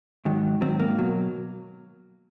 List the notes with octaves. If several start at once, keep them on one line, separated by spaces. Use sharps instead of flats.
G#2 D#3 F#3
G#2 D#3 F#3 C4
A#3
B2 F#3